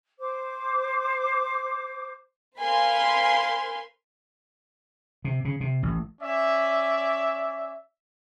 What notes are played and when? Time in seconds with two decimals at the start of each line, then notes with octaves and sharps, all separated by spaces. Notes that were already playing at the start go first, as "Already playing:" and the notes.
0.19 C5 D6
2.59 A#4 C5 F5 G#5 B5 C6
5.25 C3
5.45 C#3
5.61 C3
5.83 A1
6.21 C#4 D5 E5